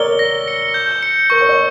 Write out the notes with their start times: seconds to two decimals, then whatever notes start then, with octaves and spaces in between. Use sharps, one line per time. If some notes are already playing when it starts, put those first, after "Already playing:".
Already playing: A#4 C#5 D5 E6 G7
0.19 A#6
0.48 C#7
0.74 G6
1.03 C#7
1.30 A#4 C#6
1.41 C#5
1.49 D5